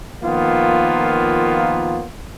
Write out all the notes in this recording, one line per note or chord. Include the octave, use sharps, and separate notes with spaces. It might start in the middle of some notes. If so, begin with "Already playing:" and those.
D#3 F3 A#3 B3 F4